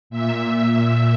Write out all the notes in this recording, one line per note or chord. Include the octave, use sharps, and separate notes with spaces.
A#2 E5